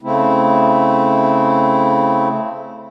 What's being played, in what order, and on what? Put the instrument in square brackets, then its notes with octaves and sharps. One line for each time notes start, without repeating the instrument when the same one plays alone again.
[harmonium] C#3 A3 C4 E4